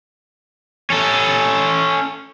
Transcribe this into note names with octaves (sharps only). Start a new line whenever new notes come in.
C#4 A4